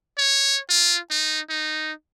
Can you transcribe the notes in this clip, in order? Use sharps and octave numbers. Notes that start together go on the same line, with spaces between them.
C#5
F4
D#4
D#4